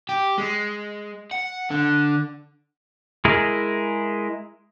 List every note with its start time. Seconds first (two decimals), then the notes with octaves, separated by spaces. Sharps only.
0.09 G4
0.38 G#3
1.31 F#5
1.71 D3
3.25 G#3 E4 G#4 A#4